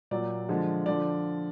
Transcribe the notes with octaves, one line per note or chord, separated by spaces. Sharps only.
A#2 F#3 D5
D3 F3 G#3
D3 F3 D5